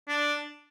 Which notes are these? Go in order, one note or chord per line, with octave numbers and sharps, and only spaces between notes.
D4